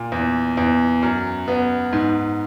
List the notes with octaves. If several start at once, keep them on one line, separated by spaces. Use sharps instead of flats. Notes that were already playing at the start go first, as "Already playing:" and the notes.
Already playing: A#2
E2
E2
F#2
B3
G#2